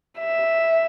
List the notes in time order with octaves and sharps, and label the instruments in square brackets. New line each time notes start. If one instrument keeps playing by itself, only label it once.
[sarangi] E5